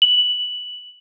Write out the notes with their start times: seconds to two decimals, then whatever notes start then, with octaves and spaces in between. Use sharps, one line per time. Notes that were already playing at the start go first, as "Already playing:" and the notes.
0.02 F#7